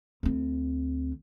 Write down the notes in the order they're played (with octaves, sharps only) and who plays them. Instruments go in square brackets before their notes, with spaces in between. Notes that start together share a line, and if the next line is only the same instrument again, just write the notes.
[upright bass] D2 C4